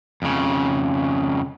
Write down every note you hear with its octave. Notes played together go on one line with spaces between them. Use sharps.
F2 C#3